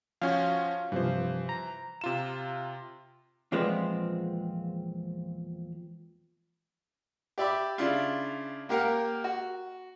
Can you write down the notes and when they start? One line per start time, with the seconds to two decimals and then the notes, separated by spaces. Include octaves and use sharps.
0.22 F3 C#4 F#4 F5 G#5
0.92 G2 C3 E3 F3 C5
1.49 A#5
2.01 C3 F4 E7
3.52 E2 A#2 F3 G#3 B3 C4
7.38 G4 D5 E5 B5 D6
7.78 C#3 D4 E4 F4
8.69 A#3 G4 A#4 F5 F#5
9.24 F#4